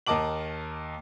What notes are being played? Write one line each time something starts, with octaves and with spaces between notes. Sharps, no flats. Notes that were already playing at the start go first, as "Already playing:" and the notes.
D#2 A#4 D#5 A5 D6 F#7